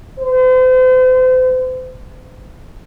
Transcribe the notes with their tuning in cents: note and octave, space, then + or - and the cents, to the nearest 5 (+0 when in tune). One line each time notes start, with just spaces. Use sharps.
C5 -40